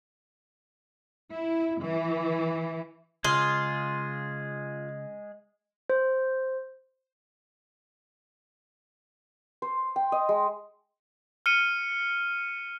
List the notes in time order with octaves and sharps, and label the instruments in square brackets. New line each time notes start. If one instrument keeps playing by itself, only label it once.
[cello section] E4
E3
[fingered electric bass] C#3 [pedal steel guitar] G#3 G#4 [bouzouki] F4 [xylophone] C6 F6
[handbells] C5
[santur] C5
G5
D#5
G#3
[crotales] F6 C#7 D#7